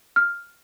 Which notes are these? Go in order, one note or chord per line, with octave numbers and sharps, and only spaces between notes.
F6